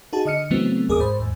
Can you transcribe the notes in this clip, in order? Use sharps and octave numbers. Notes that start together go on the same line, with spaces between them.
D#4 F#4 G#4 A5
D3 D#5 F6 C#7
C#3 E3 F#3 A3 B3 C4
G1 D#2 G#4 A#4 D6 D#6
G#2 C5 B5
D#2 G#2